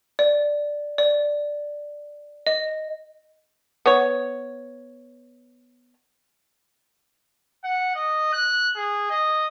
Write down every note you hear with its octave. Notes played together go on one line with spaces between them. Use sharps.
D5
D5
D#5
B3 C#5
F#5
D#5
F#6
G#4
D#5